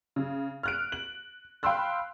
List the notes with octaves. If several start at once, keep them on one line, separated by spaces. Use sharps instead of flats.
C#3
F6 F#6 D7
F#7
F5 G5 B5 C6 E6 F#6